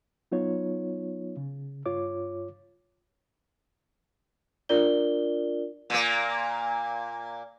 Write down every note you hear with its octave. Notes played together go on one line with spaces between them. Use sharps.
F#3 B3 D#4 F4 C#5
C#3
G2 F4 C#5 D6
D4 F4 A#4 D5 G7
A#2 A#3